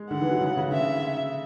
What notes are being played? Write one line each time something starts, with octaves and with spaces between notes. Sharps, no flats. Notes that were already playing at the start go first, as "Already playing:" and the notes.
Already playing: G#3
D3 F#5
E3
F#3
C#3
C#3
D3 E5